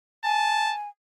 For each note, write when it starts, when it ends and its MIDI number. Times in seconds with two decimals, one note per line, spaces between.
0.25 0.88 80
0.25 0.74 81